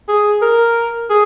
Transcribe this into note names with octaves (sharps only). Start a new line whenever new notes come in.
G#4
A#4
G#4